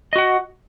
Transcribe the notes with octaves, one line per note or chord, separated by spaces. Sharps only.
F#4 D#5 F#5